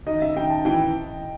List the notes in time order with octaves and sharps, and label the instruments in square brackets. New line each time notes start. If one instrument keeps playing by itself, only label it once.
[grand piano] D#3 [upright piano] D#5
[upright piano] E5
[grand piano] D#3 [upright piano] G5
[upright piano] A5
[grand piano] E3 [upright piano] G5